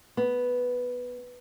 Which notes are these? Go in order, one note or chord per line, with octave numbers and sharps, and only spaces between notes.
B3